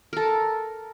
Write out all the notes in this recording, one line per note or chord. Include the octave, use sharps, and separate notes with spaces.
A4 A#4